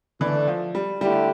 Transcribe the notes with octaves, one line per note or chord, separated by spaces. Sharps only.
D3 E3 A3 D4
F3
G3
D3 G3 A3 E4 G4